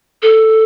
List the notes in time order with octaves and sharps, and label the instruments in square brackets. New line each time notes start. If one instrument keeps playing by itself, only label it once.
[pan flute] A4